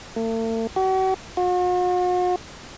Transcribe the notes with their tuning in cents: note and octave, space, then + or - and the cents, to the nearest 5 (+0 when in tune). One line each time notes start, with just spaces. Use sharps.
A3 +45
F#4 +40
F#4 -45